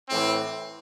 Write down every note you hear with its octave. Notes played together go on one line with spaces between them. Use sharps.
A2 E3 C4